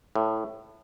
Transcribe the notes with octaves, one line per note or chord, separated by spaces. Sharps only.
A2